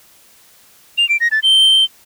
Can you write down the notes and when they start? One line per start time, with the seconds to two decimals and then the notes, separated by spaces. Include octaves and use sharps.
0.98 F7
1.09 D7
1.20 A#6
1.32 A6
1.43 G7